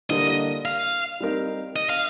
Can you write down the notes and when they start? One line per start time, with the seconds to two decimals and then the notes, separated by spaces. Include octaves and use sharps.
0.10 D3 G3 A#3 D#5
0.65 F5
1.20 G3 C4 D#4 A#4
1.76 D#5
1.90 F5